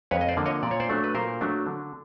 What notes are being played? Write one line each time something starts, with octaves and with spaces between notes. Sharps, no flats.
F2 B4 C#5
D#5
C5 D5
D3 F3 A#3
C#5 D#5
A#2 D5
C#5
C5 D5
F#3 A3 D4
B4
A#2 A#4 C5
F#3 A3 D4
D3